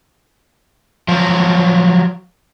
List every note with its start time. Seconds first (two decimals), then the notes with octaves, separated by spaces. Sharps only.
1.08 F3 F#3